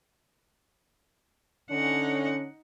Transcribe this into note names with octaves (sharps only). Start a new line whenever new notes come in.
D3 C#4 D#4 F#5